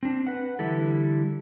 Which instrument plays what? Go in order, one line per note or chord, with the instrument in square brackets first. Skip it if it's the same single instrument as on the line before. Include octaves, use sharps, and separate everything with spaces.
[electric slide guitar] C4 D4
B4 F#5
D3 E3 G3 E4 A4